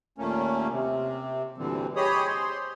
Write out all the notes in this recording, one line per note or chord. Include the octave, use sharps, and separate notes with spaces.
D#2 A#2 A3 A#3 C#4
C3
D2 A#2 D3 E3 G3 C4
G4 G#4 C#5 D#5 B5 D#6
C5 C6